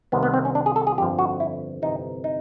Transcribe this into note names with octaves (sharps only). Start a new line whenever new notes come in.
C2 C3 D#3 B3
B3
C4
C#4
D4
G#4
A4
G#4
G1 F2 D3 F3 G4
F#4
E4
G1 F2 C3 E3 D#4
D#4